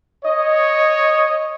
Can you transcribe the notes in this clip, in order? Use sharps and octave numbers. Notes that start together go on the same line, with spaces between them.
C#5 D#5